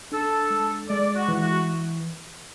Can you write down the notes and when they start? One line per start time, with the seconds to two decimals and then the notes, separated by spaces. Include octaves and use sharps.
0.12 D4 A4
0.50 G#3
0.89 G#3 D5
1.16 F#4
1.28 E3
1.41 F#4